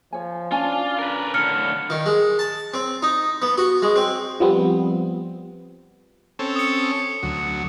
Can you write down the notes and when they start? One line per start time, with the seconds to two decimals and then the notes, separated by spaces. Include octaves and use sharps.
0.13 F3 C#5 G#5
0.52 C#4 D4 F4 G#5 A5
0.99 A#4 B4
1.34 A2 D3 F6 C#7
1.90 D#3
2.06 G#3
2.39 A5
2.74 C4
3.03 D#4
3.42 B3
3.58 F#4
3.82 G#3
3.96 C4
4.40 F3 G3 B3 C4
6.39 C4 C#4 A4
6.56 D#6 C#7
7.23 D2 F#3